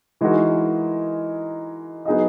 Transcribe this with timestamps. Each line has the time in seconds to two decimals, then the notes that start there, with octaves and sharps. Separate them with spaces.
0.21 E3 G#3 D#4 F#4 A#4
2.05 F#3 B3 D#4 G#4 D#5